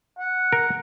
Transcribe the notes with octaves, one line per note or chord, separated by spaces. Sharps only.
F#5
A#4